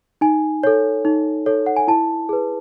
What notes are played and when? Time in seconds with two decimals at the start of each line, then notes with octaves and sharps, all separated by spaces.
0.21 D#4 G#5
0.63 A4 C#5
1.05 D#4
1.46 A4 C#5
1.66 F#5
1.76 G#5
1.88 E4 A5
2.29 G#4 B4